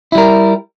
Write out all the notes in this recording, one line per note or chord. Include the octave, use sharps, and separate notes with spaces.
G3 E4 A#4